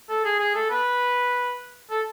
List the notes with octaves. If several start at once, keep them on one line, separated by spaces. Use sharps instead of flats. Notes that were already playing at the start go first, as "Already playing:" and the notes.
A4
G#4
G#4
A4
B4
A4